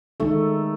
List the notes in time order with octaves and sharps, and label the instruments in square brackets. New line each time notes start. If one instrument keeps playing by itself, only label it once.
[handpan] D#3 G#3 D#4 A4 [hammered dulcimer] A3